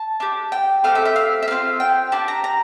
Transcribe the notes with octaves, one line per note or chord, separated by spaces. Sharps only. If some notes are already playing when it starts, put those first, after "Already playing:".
Already playing: A5
D4 G4
G5
A3 C4 G4 F5
E5
E5
F5
E5
A3 C4 F4 F5
G5
D4 G4 A5
A#5
A#5